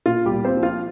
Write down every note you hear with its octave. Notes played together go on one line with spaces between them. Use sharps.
A#2 F4
G3 G4
A#2
C4 C5
F3
F4 F5